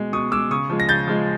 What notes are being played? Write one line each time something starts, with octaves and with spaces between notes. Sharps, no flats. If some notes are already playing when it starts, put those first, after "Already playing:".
Already playing: B2 G#3
B2 C#6 D#6
G#3 D6 E6
C#3 C#6 D#6
F3 G#3
A#6
C#3 G6 A6
F3 G#3